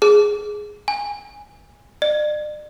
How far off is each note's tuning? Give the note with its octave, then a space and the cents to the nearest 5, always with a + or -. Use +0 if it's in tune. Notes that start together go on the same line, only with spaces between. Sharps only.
G#4 +5
G#5 -15
D5 +40